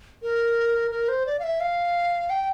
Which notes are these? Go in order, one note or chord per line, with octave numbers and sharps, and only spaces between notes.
A#4
A#4
C5
D5
F5
E5
F5
G5